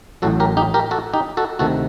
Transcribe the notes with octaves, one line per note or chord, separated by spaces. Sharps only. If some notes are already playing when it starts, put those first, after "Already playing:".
A1 A2 F#3 F#4 A4
G4 A#4
D#4 G4
G4 A#4
F#4 A4
D#4 G4
F#4 A4
D2 C3 D#3 F#4 A4